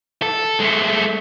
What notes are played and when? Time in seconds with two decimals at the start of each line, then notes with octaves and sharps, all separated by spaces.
0.22 A4
0.60 G#3 A3